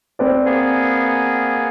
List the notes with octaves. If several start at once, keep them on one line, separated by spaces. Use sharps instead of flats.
C4 B4 D5
A#3 B3 G#4